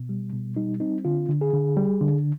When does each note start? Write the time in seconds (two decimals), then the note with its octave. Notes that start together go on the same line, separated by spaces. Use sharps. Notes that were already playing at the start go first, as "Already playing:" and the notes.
Already playing: B2
0.09 G3
0.33 B2
0.56 G3 D#4
0.80 C4 D#4
1.05 D3 F4
1.29 D3
1.41 G#4
1.53 D3
1.77 G3
2.01 D3